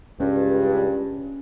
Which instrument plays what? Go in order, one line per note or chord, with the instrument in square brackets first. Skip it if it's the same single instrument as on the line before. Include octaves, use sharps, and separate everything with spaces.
[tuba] C#2 [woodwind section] G2 [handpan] C#4